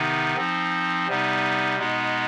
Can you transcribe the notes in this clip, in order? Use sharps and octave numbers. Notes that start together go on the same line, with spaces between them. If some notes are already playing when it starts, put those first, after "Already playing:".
Already playing: C3 D#3 B3 D#4
F3 C4 D#4
C3 G3 B3 D#4
B2 G#3 B3 D#4